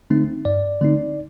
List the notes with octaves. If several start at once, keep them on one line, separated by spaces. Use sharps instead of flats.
D3 A3 C4 D#4
G2 D5
D3 A3 C4 D#4